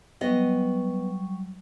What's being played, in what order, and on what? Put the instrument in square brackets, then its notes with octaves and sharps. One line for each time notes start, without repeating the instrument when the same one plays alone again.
[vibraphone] F#3 G3 C#6 [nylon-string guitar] B3 D#5